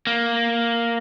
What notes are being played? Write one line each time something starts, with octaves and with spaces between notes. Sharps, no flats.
A#3